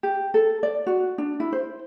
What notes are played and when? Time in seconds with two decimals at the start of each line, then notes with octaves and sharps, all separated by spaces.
0.03 G4
0.34 A4
0.63 D5
0.87 F#4
1.18 D4
1.40 E4
1.52 C5